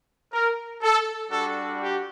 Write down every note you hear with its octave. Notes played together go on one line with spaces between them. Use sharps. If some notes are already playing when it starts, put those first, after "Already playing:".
A#4
A4
G3 D4 F#4 A4
G4